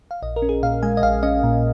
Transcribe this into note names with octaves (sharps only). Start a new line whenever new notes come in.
F5
A#1 D#5
A#4
C#4
G#4
A#2 F5
G#3 G#5
D#5
A#1 F5
C#4 D#5
A#2